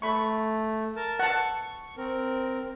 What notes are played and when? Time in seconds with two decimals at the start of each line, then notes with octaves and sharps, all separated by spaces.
0.02 A3 B5 C#6
0.96 A#4 A5
1.19 F#5 A5 C#6
1.97 C4 A#4